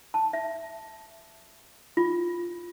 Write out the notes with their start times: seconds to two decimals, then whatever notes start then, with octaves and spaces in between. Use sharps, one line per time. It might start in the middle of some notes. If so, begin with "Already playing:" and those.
0.14 A5
0.33 E5
1.97 F4